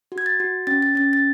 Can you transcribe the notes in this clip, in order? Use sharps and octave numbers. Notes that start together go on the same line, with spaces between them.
F#4
G#6
A6
F#4
C#4 A6
A6
C#4 A6
A6